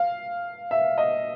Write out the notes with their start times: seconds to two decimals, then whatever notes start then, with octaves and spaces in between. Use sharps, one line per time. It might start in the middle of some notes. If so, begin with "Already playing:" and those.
Already playing: F5
0.71 E5
0.98 D#5